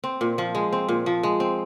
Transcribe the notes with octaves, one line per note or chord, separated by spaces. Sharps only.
C4
A#2
F3
G#3
C4
A#2
F3
G#3
C4